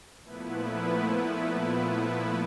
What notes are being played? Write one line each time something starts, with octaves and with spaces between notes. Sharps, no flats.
A#2 F3 A3 B3 E4 B4